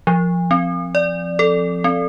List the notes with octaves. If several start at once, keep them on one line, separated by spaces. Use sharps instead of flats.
F3
C4
D5
A4
C4